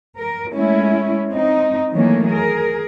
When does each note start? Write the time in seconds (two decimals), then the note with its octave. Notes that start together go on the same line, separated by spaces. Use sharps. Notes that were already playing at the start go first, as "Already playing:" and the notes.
0.18 A#4
0.52 G#3 A3 C#4 E4
1.32 C4 D#4
1.93 D#3 E3 F#3 A3 A#3 C#4
2.29 G#4 A#4